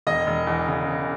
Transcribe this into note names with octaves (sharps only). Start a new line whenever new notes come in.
E1 D#5
E1
E2
C#3
C#3